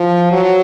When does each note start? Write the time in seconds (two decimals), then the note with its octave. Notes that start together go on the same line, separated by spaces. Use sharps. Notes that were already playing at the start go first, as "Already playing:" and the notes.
Already playing: F3
0.32 F#3